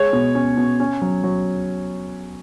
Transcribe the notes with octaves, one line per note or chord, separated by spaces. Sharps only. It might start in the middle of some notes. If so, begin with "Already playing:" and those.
Already playing: G#3 C#5
B2
C#4
B2
C#4
F#3
F#3